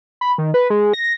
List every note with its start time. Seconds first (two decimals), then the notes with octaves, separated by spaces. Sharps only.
0.21 B5
0.38 D#3
0.54 B4
0.70 G#3
0.94 A#6